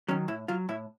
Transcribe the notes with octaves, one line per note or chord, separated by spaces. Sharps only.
D#3 F#3 C#4
A2 E4
F#3 F4
A2 E4